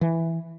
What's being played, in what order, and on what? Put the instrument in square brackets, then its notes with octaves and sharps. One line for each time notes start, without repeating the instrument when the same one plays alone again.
[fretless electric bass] E3